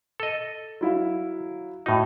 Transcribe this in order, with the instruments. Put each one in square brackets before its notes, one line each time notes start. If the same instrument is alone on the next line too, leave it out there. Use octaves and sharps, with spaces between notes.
[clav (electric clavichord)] A4 D#5
[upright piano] F#3 E4 F5
[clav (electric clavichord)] A2 D#4 [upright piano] F#4